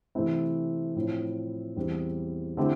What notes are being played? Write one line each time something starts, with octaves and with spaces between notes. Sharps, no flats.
C3 E3 A3 C4 E4
A2 F3 C4 E4
E2 E3 G3 C4
D3 A3 C4 E4 G4